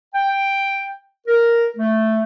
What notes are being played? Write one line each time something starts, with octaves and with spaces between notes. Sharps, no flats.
G5
A#4
A3